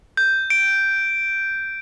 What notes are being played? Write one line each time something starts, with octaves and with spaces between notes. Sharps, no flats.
G6
D7